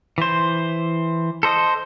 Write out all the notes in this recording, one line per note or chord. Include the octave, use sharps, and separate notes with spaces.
E3 C5
A4 C5 D#5